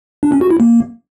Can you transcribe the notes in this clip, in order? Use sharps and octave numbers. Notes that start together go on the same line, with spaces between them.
D4
C#4
F#4
E4
A#3